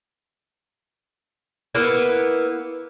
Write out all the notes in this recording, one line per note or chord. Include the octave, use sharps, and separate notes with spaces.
A#3 B3 E4 B4